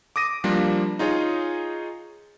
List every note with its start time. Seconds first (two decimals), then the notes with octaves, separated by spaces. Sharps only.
0.16 D6 D#6 A#6 D#7
0.44 F3 G3 A#3 D4
0.99 D#4 F4 G#4 C#5 D#5